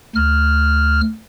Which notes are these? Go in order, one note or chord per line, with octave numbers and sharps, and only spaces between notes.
D2 F6